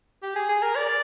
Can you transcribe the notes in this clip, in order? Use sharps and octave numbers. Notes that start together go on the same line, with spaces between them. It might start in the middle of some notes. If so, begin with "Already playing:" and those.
G4
G#4
G#4
A#4
D5